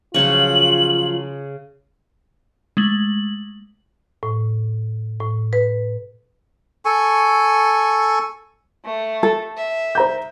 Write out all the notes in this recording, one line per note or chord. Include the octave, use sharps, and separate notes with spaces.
C#3 F3 F#3 F4 C#6 F#7
G#3 A3 F#7
A2
A2
B4
A4 G#5 C#6
A3
A4
E5
C5 A#5 G6